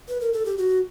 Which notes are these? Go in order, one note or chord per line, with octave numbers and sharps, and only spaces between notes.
B4
A#4
A4
G4
F#4